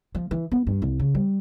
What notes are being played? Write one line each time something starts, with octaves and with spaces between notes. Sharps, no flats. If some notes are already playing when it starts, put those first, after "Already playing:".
F3
E3
B3
G2
C2
C#3
G3